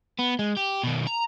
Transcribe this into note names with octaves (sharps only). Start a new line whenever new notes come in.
B3
G#3
G4
B2 D#3
A#5